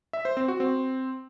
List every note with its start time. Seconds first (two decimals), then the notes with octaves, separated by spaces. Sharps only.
0.13 E5
0.25 C5
0.37 C4
0.48 F#4
0.60 C4